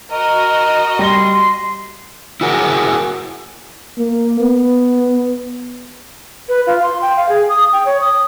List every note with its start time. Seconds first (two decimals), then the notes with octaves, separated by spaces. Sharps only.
0.12 F#4 A#4 D#5
0.99 G3 C6 A#6 G7
2.41 E4 F#4 G#4 A#4
3.99 A#3
4.40 B3
6.49 B4
6.67 F4
6.82 C6
7.02 G5
7.16 F5
7.29 G#4
7.49 D#6
7.73 G5
7.86 C#5
8.01 D#6